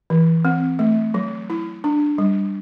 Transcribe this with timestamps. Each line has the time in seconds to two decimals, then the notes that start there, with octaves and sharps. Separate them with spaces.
0.10 E3
0.45 C4
0.79 A3
1.14 F#3
1.50 E4
1.84 D4
2.18 G3